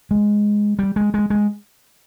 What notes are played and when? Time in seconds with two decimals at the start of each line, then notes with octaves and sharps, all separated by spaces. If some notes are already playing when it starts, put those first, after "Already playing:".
0.11 G#3
0.79 G3
0.96 G#3
1.14 G#3
1.30 G#3